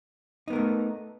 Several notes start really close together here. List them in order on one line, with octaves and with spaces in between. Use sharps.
D#4 B3 A#4 A3